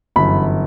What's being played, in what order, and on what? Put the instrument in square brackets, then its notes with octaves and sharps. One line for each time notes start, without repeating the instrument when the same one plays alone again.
[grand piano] G1 F#2 E3 B5